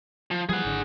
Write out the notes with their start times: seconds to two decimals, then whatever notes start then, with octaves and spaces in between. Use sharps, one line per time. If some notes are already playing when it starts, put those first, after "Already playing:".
0.31 F3
0.49 E3 F3 G3 G#4 F#5
0.65 G#1 D3